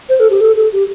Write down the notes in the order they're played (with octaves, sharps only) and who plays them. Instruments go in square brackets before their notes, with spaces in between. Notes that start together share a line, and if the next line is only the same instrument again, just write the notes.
[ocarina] C5
A4
G4
A4
A4
G4